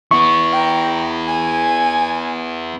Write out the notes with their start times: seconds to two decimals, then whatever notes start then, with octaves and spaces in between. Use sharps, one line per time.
0.11 B3 E4 C#6
0.52 G5 A#5
1.27 G#5